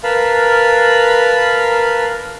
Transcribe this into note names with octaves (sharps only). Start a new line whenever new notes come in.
A#4 B4 F5 A5 B5